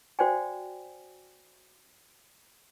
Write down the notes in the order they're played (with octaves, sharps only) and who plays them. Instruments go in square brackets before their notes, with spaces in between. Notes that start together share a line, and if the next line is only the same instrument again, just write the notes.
[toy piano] F#4 C5 D5 G5 G#5